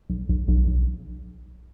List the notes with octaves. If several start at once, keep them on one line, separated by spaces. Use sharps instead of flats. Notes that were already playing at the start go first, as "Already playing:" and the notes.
B1
B1
B1
B1